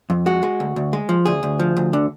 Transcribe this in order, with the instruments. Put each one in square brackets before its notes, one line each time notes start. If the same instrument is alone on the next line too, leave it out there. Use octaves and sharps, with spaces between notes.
[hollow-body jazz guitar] F2
G#3 F#4
G#3
D2
D2
G#3
F3
D2 G#4
D2
F3
D2
D3